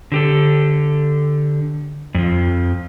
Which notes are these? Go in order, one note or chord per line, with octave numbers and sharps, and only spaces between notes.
D3 G4 A4
F2 F3